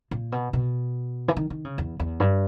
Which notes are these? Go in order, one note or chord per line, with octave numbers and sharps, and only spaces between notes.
A#2
B2
B2
E3
D#3
D#3
C#3
E2
E2
G2